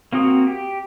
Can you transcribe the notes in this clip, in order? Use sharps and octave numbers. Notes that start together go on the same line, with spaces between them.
A#3 C4 F#4 D#6
G4